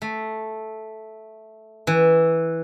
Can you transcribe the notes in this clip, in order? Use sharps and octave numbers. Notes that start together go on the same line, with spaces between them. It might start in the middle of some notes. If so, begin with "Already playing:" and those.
A3
E3